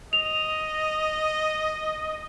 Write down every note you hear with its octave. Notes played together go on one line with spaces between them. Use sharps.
D#5 F7